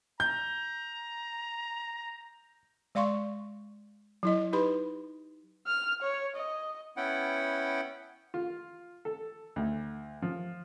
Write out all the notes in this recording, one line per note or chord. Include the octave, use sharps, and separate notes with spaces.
A#5 G6
G#3 D5 F5 C6 C#6
F#3 E4 D#5
D#4 G4 B4 B5 C6
F6
C#5
D#5
B3 C#4 E4 F#5 G5
F4
A4
D2
F3